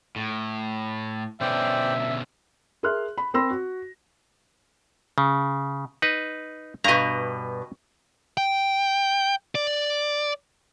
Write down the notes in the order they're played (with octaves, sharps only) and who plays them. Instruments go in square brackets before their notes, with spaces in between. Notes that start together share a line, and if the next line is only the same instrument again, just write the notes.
[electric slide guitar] A2
[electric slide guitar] B2 D3 C#4 [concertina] C5 D5 G5 [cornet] E5
[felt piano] G#4 A#4 E5 C6 F6 F#6
B5
C4 A#4 B5 C6 E6 A#6
F#4
[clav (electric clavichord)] C#3
D#4 B4
[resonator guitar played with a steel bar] G2 B2 [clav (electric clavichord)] D#5 A#5
[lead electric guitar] G5
D5